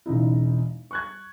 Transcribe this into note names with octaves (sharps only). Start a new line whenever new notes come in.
E1 C#3 D#4 E4
C#6 F#6 G#6